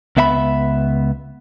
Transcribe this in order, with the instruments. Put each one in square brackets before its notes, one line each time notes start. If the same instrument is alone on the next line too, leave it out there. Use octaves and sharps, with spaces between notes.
[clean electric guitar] C#2 B3 E5 F5 B5